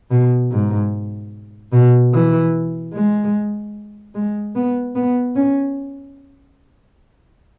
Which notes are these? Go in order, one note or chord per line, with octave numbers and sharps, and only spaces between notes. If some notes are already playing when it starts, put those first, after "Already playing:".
B2
G#2
B2
E3
G#3
G#3
B3
B3
C#4